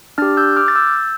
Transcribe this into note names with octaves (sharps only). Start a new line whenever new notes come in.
D4 G4 F6 A6
E6 G6
D6 F6
A6
E6 G6